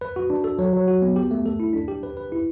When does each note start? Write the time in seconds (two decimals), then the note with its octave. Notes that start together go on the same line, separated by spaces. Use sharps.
0.01 B4
0.16 F#4
0.30 D4
0.44 A4
0.59 F#3
0.73 F#3
0.88 F#4
1.02 B3
1.16 G4
1.31 A3
1.46 A4
1.60 E4
1.73 D4
1.88 G4
2.03 B4
2.17 B4
2.32 E4